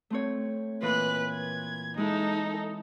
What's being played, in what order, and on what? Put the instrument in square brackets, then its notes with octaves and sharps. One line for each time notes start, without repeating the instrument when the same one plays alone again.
[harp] A3 C4 C#5
[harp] A#2 E3 F4 [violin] B4 F#6
[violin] G#6
[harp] G#3 E4 [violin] D#4 A4